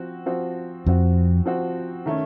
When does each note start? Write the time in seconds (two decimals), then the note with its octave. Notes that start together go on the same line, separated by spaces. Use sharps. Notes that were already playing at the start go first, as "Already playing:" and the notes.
Already playing: F3 C4 F#4
0.26 F3 C4 F#4
0.86 F2 F3 C4 F#4
1.46 F3 C4 F#4
2.06 D#3 A3 C#4